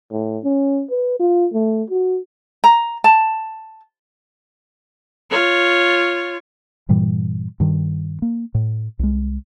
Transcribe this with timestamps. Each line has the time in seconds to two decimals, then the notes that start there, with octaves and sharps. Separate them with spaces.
0.12 A2
0.44 C#4
0.90 B4
1.19 F4
1.53 A3
1.90 F#4
2.64 A#5
3.04 A5
5.31 F4 C#5
6.89 G2 A#2 E3 G3
7.60 G2 D#3
8.22 A#3
8.55 A2
8.99 C2 G#3